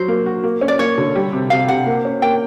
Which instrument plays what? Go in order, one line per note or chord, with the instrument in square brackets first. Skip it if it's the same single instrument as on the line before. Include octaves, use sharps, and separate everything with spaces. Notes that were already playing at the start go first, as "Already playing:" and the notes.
Already playing: [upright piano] F#3 F#4 [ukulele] C5
[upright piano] A#3
F#4
A#3
C#4
[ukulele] D5
[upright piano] A#3 [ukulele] C#5
[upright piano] D3
G3
C3
[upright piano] C3 [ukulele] F5
[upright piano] C3 [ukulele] F#5
[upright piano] A#3
C#4
[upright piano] A#3 [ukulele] G5